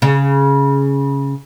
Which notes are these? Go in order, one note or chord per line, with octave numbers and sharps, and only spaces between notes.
C#3